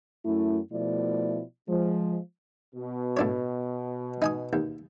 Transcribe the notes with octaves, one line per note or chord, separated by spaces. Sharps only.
F#2 A3 E4
B2 F3 A3 E4 D5
F3 G#3
B2
A2 D4 C#5
D#4 G#5 D#6
D#2